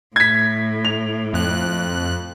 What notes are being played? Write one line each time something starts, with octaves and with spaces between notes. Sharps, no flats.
A2 G#6 B6
F7
F2 F#6